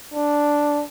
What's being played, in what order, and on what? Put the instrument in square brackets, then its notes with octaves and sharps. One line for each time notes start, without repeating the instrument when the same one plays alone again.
[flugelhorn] D4